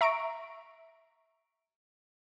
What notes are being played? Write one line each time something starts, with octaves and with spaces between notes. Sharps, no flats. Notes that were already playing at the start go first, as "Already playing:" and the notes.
E5 A#5 C#6 D7